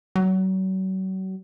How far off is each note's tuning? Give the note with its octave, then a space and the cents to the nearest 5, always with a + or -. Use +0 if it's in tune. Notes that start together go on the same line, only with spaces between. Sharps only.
F#3 +35